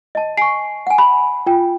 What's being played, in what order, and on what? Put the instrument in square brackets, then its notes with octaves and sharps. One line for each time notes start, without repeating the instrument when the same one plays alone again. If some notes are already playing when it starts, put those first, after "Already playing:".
[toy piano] D#5 A5
[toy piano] G#5 C#6 [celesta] C7
[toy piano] F#5 G#5
[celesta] B5
F4 G5